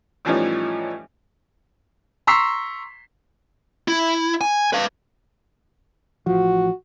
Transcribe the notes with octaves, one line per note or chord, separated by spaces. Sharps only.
A2 E3 F3 G3 C#4 D#4
A#5 C6 C#6 E6 B6 C7
E4
G#5
B4 F5
A1 F3 F#4